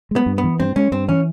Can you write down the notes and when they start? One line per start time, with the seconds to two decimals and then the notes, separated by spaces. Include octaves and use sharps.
0.11 G#3
0.16 B3
0.26 G2
0.38 B3
0.44 E3
0.60 G2 C4
0.76 G#3 C#4
0.92 G2 C4
1.09 E3 C#4